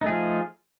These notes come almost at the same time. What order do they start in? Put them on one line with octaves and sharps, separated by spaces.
D#4 A3 G#4 F3 F4